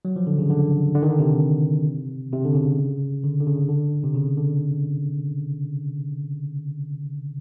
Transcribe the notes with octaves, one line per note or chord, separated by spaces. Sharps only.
F#3
F3
D3
C#3
D3
D3
D#3
D3
C3
C3
D3
C#3
D3
D3
C#3
D3
C3
C#3
D3